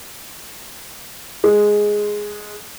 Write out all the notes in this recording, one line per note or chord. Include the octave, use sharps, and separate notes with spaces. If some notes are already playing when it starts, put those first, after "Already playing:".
G#3